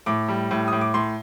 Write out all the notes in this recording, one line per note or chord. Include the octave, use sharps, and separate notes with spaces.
A2 D6
G3
A2
A2 D#6
D6
A2 C6